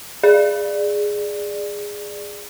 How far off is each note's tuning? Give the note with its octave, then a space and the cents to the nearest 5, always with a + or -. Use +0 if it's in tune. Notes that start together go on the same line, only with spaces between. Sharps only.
G#4 -5 D5 +15